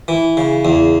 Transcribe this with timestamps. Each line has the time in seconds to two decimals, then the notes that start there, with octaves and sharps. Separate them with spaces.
0.08 E3
0.37 C#3
0.65 E2